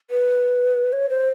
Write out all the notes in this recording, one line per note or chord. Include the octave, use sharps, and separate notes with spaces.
B4
C#5
C5